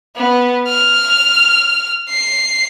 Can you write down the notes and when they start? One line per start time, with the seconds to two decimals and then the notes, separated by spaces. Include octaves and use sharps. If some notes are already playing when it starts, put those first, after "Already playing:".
0.16 B3
0.68 F6
2.09 C7